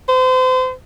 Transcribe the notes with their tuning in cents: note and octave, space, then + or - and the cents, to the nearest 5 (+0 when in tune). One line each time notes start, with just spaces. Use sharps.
C5 -35